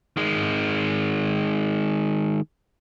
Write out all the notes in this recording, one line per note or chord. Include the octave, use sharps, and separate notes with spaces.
D#3 G#3